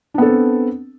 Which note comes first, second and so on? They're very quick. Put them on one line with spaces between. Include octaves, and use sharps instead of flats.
D4 B3 A4 C4